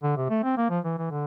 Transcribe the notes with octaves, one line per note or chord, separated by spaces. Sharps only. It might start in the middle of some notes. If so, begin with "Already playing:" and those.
D3
C3
A3
C4
A#3
F3
E3
E3
D3